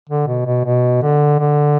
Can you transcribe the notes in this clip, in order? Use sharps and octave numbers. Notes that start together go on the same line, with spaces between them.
D3
B2
B2
B2
D3
D3